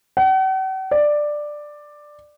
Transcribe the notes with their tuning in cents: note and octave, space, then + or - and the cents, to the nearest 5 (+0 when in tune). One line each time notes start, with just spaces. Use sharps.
F#5 +45
D5 +10